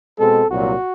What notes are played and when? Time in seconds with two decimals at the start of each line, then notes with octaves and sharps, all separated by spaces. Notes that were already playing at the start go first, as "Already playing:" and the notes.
0.19 B2 G#3 C4 A4
0.49 C2 A#2 F#3 F#4